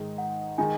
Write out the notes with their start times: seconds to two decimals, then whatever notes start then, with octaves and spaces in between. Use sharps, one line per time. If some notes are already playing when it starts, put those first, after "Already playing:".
Already playing: G#2 D#3 G#3 D#4
0.18 F#5
0.58 D#3 G#3 D#4 G#5